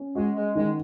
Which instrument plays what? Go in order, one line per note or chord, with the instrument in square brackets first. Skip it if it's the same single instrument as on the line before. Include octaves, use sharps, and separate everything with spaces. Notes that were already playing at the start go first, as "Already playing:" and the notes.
Already playing: [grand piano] C#4
[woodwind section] G#3 [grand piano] F#4
[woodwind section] G#3
[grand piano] D#3 [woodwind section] G#3